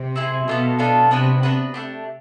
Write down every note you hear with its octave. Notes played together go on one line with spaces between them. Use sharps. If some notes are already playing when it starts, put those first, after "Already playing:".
Already playing: C3
C4 E4 G#4
B2 B3 D4 F4 A4
B3 D4 F4 A4
C3 B3 D4 F#4 B4
B3 D4 F#4 B4
A3 D4 G4